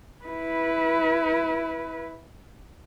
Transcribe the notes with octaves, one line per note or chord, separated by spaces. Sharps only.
E4 B4